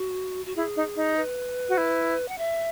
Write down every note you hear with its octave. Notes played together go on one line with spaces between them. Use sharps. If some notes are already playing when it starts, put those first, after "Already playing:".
Already playing: F#4
F#4
E4 G#4
D#4
D#4
B4
F#4
E4
F#5
E5